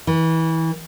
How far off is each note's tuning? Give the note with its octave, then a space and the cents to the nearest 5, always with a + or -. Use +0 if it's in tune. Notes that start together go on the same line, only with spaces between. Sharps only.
E3 -25